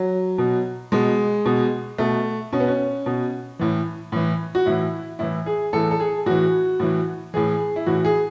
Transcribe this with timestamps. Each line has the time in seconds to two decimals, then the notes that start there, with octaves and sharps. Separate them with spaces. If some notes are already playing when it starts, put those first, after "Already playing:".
Already playing: F#3
0.38 B2
0.92 B2 G#3
1.46 B2
1.98 B2 A3
2.53 B2 C#4
2.60 B3
2.68 C#4
3.06 B2
3.59 A2 E3
4.12 A2 E3
4.55 F#4
4.66 A2 E3 E4
5.19 A2 E3 E4
5.46 G#4
5.73 A2 E3 A4
5.91 A4
6.00 G#4
6.26 A2 E3 F#4
6.80 A2 E3
7.34 A2 E3 G#4
7.76 E4
7.86 A2 E3 F#4
8.05 G#4